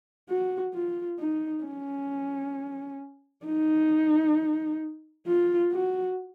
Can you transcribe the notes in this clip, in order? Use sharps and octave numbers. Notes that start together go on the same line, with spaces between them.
F#4
F4
D#4
C#4
D#4
F4
F#4